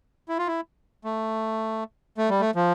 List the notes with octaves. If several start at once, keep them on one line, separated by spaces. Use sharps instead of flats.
E4
F4
E4
A3
A3
G3
A3
F3